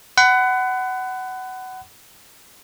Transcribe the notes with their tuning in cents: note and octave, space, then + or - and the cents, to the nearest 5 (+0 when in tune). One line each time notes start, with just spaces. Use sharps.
F#5 +20 B5 +35